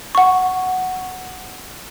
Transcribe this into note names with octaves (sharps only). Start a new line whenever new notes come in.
F#5 C#6